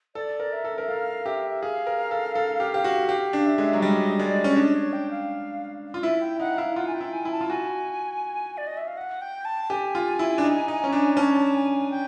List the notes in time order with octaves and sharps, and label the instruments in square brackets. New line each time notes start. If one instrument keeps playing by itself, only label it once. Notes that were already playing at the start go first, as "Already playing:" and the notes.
[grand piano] A4 [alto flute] D5
[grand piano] A#4
[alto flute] E5
[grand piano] A4
A#4
[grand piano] A4 [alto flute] F5
[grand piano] G4 [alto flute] E5
[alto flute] E5
[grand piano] G#4 [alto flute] F5
[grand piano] A#4
A4
A4
G4
G4
F#4
[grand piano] G4 [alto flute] F5
[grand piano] D4
[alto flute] E5
[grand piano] G#3
F#3
[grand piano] G3 [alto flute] D#5
[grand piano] G#3 [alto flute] D5
[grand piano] C#4
[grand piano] D4 [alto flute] D#5
[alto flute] C#5
G5
F5
[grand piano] F4
[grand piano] E4 [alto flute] E5
[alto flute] G5
[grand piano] D#4 [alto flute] F#5
[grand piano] E4 [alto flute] F5
[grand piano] F4 [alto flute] F#5
[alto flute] G#5
G5
[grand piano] E4
[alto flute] G#5
[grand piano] E4
[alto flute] A5
[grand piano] F4
[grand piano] F#4 [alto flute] G#5
[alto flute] D5
D#5
E5
F5
F#5
G5
A5
[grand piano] G4 [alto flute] G#5
[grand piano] F4
E4
D4
D#4
D#4
C#4
D4
[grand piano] C#4 [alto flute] A5
[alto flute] G#5
G5